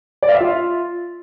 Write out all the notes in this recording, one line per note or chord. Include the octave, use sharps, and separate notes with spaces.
D5
F5
E5
F4